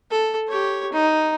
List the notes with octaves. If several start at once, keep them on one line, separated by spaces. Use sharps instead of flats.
A4
G4 C#5
D#4